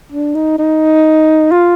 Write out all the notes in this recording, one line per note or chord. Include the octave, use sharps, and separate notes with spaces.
D4
D#4
D#4
F4